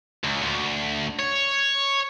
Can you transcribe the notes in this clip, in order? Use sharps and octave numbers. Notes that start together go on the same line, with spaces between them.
C#2
D2
C#5